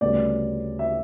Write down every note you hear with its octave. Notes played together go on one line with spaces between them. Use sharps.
D2 C#3 G3 B3 D5
E5